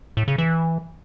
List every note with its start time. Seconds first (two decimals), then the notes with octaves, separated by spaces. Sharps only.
0.17 A2
0.28 C#3
0.38 E3